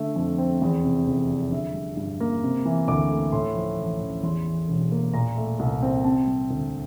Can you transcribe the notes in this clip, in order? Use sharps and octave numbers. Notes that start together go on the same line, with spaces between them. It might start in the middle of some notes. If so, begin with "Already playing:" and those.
Already playing: D3 A3 E5
F2
C4
E2
C3
F1
F3
D3 E5
G3
G2
A#3
C3
E3
D2 D6
A3
A2 C6
F3
A1
A1
E2 C6
E3
E1
A#3
A#2 A#5
A3
C2
C4
C3 A5
G3
D2